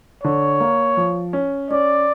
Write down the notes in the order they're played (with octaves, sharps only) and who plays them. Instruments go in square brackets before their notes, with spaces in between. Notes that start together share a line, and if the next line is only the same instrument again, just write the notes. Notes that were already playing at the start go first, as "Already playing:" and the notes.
[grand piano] D3 [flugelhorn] C#5
[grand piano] A#3
F3
C#4
[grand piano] C#4 [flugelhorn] D5